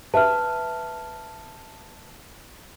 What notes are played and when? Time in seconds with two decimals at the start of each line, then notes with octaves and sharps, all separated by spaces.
0.14 B4 E5 A5 F6